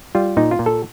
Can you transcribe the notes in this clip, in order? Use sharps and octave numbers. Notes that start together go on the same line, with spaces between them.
G3 F4
A#2 D#4
F4
A#2
A4